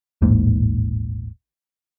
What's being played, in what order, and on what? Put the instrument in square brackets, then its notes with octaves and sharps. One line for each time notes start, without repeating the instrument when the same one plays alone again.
[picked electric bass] D#1 A1 G#2 A#3